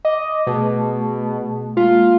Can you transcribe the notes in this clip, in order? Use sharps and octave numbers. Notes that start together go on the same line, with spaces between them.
D#5 D6
B2 A3 G#4 A5
G#3 A#3 F4